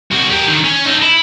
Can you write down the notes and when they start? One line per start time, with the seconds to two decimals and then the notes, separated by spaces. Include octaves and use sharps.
0.11 C2 F#4
0.30 G4 A#4
0.47 D3 D#3
0.64 C#4
0.85 D#4 A4
1.02 E4